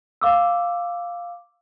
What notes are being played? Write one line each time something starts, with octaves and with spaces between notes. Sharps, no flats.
F5 D6 E6